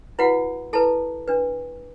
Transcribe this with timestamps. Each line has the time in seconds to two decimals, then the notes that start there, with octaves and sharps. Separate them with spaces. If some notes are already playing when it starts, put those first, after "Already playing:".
0.19 E4 F#4 B4 F#5
0.73 E4 A4 B4 A5
1.28 D4 B4